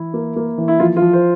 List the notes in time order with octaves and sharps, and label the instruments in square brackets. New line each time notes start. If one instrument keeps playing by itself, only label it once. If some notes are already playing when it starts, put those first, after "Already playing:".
Already playing: [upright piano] E3 [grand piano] E4
[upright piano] A#3
A#3
E3
[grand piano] E4
[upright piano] F3 [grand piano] F4
[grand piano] F4
[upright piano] F3
[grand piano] C5